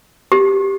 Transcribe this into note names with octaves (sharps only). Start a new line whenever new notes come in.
G4